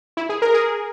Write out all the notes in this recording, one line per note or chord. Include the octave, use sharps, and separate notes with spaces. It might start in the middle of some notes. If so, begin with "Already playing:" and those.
E4
G#4
A#4
G#4